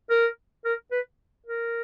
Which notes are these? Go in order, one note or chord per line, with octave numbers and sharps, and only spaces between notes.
A#4
A#4
B4
A#4